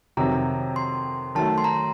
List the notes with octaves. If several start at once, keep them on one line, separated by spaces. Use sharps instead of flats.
F2 C3 D#3 F#3 A#5
C6
D#3 F#3 A3 A5
C6
A#5